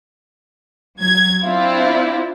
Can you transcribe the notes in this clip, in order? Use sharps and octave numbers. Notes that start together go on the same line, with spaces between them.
F#3 G#6
C4 D4 E4 F4